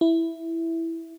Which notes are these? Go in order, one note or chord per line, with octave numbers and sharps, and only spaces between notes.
E4